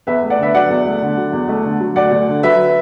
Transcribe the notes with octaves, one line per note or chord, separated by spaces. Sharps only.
E2 B4 E5
A3
D5 F#5
D3 B4 E5
F#3 D5 F#5
E2
A3
D3
F#3
E2
A3
D3
F#3
D2 D5 F#5
D2
D3
F#3 B4 E5